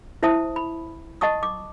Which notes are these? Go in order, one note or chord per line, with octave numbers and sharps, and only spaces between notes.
E4 C5 E5 A5 D#6
B5
D#5 F#5 A5 C#6 D#6
D6